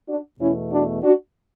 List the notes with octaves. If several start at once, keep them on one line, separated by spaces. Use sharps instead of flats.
D4 F#4
E2 B2 A3 C#4 E4
D4 F#4
D4 F#4